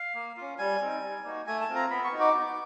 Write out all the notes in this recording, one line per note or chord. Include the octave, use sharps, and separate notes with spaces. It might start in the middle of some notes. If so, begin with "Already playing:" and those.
Already playing: F5
A#3
C#4 F4
G3 G#5
C4 D#4
G3
A#3 D#4 F#4
A3 G#5
A5
C4 F4
A#5
B3 B5
C#6
D#4 F#4
D6
B3